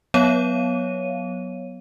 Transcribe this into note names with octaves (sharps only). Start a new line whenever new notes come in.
F#3 B3 C#5 F5 D#7